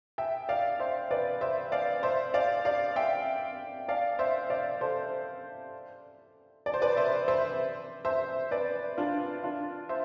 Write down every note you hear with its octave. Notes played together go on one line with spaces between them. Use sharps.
E5 G5
D5 F5
C5 E5
B4 D5
C5 E5
D5 F5
C5 E5
D5 F5
D5 F5
E5 G5
D5 F5
C5 E5
D5 F5
A4 C5
D5
C5
B4 D5
C5 E5
C5 E5
C5 E5
B4 D5
D4 F4
D4 F4
C5 E5